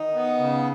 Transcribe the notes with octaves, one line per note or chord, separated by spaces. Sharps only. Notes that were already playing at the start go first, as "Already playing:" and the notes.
Already playing: D#3 D#4
B3
C#3